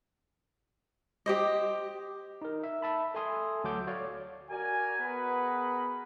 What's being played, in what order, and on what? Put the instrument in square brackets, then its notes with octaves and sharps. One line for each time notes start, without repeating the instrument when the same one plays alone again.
[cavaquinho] G4 C5 D#5
[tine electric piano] D#4 A#4
E5
E5 A5 B5
A4 E5 G#5 C6 D#6
D2 F#3 A4 F#5 D6 G6
F#4 C#5 D5 F5
[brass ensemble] F#4 A#4 D5 G#5
B3 F#4 G#4 A#4 B4